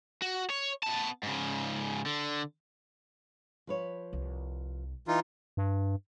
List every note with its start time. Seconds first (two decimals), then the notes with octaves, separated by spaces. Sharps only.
0.22 F#4
0.50 C#5
0.83 B3 A5
1.23 G#2 C#3
2.06 D3
3.67 F3 B4 C#5
4.13 C2
5.08 E3 D#4 F4
5.57 G2